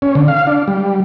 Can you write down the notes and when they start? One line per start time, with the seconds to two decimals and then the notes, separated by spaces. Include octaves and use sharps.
0.02 C#4
0.15 D3
0.28 F5
0.47 D4
0.68 G3